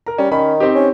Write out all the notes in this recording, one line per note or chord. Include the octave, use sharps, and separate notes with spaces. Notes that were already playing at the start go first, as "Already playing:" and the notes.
A#4 A#5
G3 C#4
D#3 C#4 B5
C4 D#4 G4
C#4